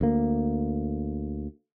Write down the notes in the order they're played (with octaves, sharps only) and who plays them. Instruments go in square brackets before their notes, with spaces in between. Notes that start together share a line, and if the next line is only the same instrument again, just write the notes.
[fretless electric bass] D2 A#3